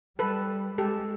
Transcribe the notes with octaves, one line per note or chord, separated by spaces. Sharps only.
G3 A4 B4
G#3 G4 A4